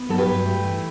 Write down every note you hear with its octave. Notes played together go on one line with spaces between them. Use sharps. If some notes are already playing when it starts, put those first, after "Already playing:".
Already playing: B3
F#3 A4
G4 B4
G2
A3
E3